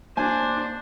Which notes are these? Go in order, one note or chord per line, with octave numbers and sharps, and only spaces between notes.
A#3 D4 C5 G#5